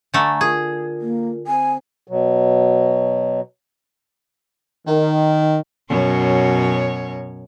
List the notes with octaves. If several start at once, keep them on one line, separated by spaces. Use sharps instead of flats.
D3 A3 G#5 A#5 C#6
F4 G#4 A#4
A#3
C4 C5 G#5
B2 F#3
D#3
F#2 B2 C#5